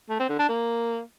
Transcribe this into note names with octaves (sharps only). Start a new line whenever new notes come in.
A3
C4
D3
D4
A#3